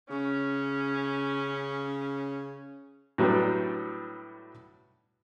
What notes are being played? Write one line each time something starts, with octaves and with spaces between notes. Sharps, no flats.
C#3 C#4
A2 F#3 G3 B3 D4